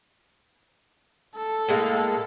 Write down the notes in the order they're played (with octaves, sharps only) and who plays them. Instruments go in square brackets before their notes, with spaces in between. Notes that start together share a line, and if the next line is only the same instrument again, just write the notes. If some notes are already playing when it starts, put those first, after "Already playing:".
[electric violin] A4
[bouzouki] A2 G#3 A#3